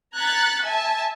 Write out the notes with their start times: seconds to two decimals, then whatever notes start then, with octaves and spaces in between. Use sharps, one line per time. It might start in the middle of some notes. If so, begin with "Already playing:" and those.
0.15 A#5 F#6 G#6 A6 B6 C#7
0.64 E5 G#5 A5